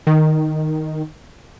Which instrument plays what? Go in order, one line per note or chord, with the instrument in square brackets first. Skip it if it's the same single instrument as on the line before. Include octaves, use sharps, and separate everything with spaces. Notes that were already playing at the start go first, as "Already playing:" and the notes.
[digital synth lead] D#3